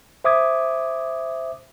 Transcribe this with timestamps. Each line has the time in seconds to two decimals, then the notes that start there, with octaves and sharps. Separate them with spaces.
0.24 C5 E5 D6 D#6 G#6